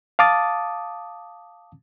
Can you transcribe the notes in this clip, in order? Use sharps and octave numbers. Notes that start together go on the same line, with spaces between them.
F5 A5 D6 D#6 A6